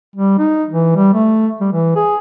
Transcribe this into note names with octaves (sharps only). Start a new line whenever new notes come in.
G3
D#4
E3
G3
A3
G3
E3
G#4